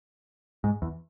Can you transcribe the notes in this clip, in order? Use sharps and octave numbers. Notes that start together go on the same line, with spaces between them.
G#2
E2